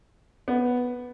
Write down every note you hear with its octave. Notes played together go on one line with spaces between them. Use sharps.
B3